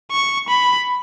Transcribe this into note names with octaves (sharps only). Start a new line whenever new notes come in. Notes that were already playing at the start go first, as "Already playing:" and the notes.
C#6
B5